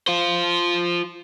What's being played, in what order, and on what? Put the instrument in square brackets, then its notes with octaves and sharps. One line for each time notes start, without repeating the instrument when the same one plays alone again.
[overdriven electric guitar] F4 C5